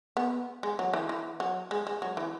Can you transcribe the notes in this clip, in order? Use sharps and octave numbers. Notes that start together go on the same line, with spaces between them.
B3
G#3
F#3
E3
E3
F#3
G#3
G#3
F#3
E3